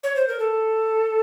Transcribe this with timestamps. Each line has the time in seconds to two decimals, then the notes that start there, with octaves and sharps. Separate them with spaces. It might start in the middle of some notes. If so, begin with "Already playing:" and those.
0.03 C#5
0.16 C5
0.28 A#4
0.39 A4